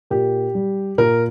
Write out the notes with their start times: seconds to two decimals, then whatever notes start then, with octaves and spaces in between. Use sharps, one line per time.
0.10 A#2 G4
0.55 G3
0.98 A#2 A#4